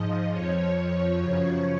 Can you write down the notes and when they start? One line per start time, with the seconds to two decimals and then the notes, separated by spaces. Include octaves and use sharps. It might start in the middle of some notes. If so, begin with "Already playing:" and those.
Already playing: G#2 F3 D#5
0.31 F2 F3 C#5
1.18 F#2 C#3 F3 C#5